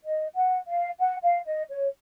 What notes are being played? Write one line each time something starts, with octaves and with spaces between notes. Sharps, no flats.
D#5
F#5
F5
F#5
F5
D#5
C#5